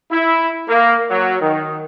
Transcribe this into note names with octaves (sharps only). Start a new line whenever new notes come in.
E4
A#3
F#3
D#3